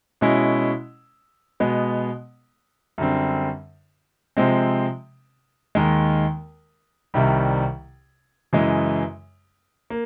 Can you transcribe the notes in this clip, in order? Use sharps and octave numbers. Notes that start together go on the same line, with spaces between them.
B2 G#3 C#4 E4
B2 G#3 B3
F#2 D3 G3 C4
C3 F3 G#3 C4
D#2 D#3 G#3
C2 C3 D#3 G3
F#2 C#3 E3 G#3
A#3